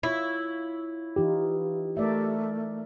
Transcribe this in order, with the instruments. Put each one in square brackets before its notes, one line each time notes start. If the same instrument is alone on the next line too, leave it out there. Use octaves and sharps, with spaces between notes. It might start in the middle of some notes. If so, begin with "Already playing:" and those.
[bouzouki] E4 [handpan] F4 C#5
[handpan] E3 D#4 F4 [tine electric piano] G4
[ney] A3 [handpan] A#4 D5 E5